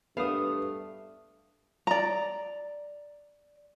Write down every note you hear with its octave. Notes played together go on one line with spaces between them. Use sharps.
G2 A3 B3 D4 F5 D#6
D5 A#5